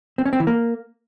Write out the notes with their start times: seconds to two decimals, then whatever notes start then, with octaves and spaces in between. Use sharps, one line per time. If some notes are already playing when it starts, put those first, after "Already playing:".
0.18 C4
0.26 C#4
0.33 C4
0.40 E3
0.47 A#3